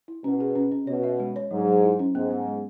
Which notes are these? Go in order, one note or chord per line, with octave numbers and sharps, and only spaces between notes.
E4
B2 C#4
G#4
C#4
C#4
B2 C#5
E5
G#3
C#5
G#2 F#3
F#3
E4
C#4
G#2 B3
B3
G#3